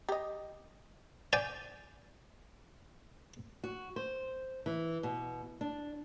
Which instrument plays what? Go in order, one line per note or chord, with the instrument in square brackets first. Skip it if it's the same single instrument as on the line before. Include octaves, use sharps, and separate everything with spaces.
[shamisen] G4 D#5
[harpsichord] D5 G5 G#5
[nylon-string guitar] F#4
C5
E3
B2
D4